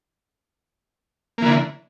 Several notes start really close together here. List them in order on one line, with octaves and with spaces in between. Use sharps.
A#3 E3 D3